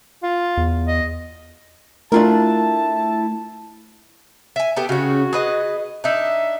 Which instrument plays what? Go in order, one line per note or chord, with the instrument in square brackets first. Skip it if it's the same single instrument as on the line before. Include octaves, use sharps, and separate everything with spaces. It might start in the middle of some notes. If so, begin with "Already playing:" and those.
[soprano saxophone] F4
[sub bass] E2
[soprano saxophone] D#5
[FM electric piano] A3 [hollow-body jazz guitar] D4 F4 A#4 [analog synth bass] E4 [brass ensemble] A5
[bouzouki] E5 G#5
B3 G4 A4
[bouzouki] C#3 C#4 [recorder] F#4
[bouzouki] G#4 B4 D#5
[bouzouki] D4 D#4 [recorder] E5